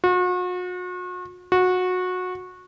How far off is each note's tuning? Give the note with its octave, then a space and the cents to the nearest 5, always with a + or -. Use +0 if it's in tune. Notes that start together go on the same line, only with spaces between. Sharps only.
F#4 -40
F#4 -20